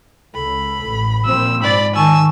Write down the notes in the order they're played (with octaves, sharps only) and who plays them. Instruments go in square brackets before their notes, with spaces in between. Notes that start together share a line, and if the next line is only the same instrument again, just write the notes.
[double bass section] C#2 [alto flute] A4 [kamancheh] B5
[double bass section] A1
[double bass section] A#2 F3 [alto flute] C4 [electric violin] E6
[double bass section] G#2 [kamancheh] D5 [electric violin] B5
[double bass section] D#3 [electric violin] G#5 A5 [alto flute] C#6 [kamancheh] E6